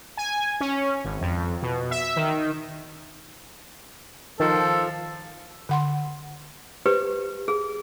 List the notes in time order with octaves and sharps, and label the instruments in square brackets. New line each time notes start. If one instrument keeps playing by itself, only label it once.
[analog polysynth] G#5
C#4
G#1
F2
B2
E5
D#3
[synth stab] D#3 [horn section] F3 [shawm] A4
[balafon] D3 F#5 C6
[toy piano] G4 B4 [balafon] C5
[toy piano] G#4